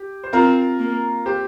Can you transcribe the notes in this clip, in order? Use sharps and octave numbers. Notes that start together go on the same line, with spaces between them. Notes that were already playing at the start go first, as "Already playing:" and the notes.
Already playing: G4
C5
C4 F4 A#4
A#3
G4 C5